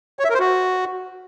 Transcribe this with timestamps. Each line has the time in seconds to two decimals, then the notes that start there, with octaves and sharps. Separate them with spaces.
0.19 C#5
0.24 E5
0.29 A#4
0.34 C5
0.39 F#4